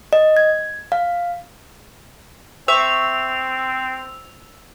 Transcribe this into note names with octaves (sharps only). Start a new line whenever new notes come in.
D#5
G#6
F5
C4 C5 E5 C#6 D6 E6 F7